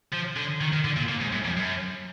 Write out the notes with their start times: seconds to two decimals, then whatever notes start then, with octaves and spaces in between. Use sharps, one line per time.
0.12 F3
0.36 D3
0.61 D#3
0.73 D#3
0.85 D3
0.97 A#2
1.09 A#2
1.21 G#2
1.33 F#2
1.45 F2
1.58 F#2